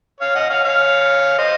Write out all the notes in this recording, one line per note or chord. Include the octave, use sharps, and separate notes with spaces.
C#5 F5
D#5 F#5
C#5 F5
C#5 F5
C5 D#5